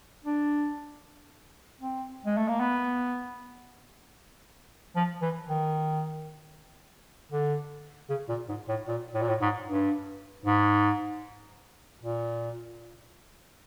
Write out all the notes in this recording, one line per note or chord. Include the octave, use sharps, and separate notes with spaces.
D4
C4
G#3
A3
A#3
B3
F3
E3
D#3
D3
C#3
A#2
G#2
A2
A#2
A2
A#2
A2
G#2
G2
G#2
A#2